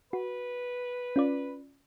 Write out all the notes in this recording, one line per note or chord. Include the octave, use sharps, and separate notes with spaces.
F#4 B4
C#4 F4 D5